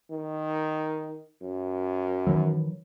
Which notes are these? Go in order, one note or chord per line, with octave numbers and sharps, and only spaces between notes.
D#3
F#2
D#3 E3 F#3